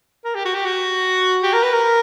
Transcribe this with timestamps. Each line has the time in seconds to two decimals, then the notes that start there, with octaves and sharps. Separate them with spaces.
0.25 A#4
0.35 G4
0.45 F#4
0.55 G4
0.65 F#4
1.43 G4
1.53 A#4
1.63 B4
1.73 A#4